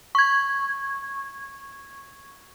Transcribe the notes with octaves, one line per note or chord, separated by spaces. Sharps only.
C#6 G#6